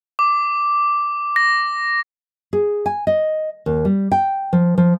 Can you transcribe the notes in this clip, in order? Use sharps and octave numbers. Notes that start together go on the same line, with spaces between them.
D6
A#6
G#4
G#5
D#5
D#2
G3
G5
F3
F3